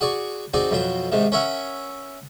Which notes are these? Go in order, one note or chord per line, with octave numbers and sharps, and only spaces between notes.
F#4 G#4 D5 C#6
C4 D#4 F#4 G#4 D5
F2 B2 F#3 C5
G#2 C3 D#3
C#4 A#4 C#5 E5 F#5